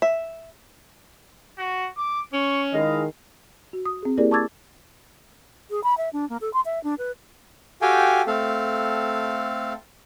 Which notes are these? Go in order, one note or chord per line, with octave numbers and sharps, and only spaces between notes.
E5
F#4
D6
C#4 C#6
D#3 G#3 E4 D#5 F5
F#4
D#6
C4 G#4
A#3 E4 G4 G#4 A#4 D5
A5 C#6 D6 E6 G#6 A6
G#4
B5
E5
D4
A#3
A4
C6
E5
D4
B4
F#4 G4 A4 F5 G5 G#5
A3 C4 A4 F5